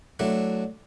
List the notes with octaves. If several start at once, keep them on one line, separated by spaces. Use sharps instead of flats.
F#3 A3 D4 E4